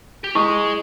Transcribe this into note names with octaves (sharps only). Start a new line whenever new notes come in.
G4
E4 G#4 D#5 C#6